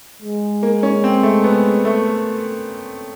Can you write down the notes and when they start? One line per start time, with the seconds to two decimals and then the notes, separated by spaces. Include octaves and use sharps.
0.22 G#3
0.63 A#3
0.83 C#4
1.04 C4
1.23 A3
1.44 B3
1.85 A3